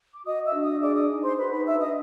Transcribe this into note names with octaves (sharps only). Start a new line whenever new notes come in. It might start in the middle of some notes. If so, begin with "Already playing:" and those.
D6
F#4 D#5 D#6
E5 E6
D4
D#5 D#6
G#4 D5 D6
D#5 D#6
D#4
C5 C6
F#4 B4 B5
B4 B5
D4 E5 E6
D#5 D#6